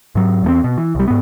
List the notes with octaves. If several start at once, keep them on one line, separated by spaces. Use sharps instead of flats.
G#2 F#3
E2 A3 C4
B2
E3
C2 G3
G#2 B3